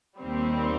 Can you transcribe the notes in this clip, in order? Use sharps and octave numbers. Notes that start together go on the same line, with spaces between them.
D#2 D#3 G3 C4